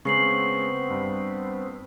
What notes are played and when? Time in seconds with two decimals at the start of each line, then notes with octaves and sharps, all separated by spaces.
0.05 C#3 G#3 B3 C4 C#6 C7 F#7
0.90 G2